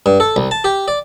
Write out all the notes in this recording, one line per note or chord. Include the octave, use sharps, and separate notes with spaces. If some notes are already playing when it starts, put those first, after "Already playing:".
G2
A4
C2
A5
G4
D5